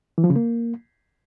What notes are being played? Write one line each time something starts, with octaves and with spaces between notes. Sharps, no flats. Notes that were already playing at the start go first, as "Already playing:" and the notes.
E3
F3
C#3
A#3